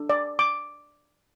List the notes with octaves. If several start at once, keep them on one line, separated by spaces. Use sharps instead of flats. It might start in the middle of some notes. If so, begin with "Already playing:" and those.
Already playing: D4 A4
D5
D6